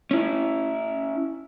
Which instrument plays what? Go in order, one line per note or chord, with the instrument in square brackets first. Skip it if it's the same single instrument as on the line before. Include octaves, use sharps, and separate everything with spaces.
[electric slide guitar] C#4 E4